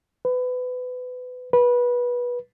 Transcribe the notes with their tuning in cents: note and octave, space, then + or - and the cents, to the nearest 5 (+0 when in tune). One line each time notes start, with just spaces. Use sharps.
B4 +25
B4 -20